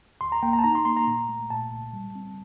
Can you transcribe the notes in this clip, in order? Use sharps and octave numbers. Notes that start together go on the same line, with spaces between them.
D2 C6
A#5
A#3 G5
A#5
A5
D#4 A#5
C6
A#3 C6
A#5
A#2
A3
A#2 A5
C2
G3
C4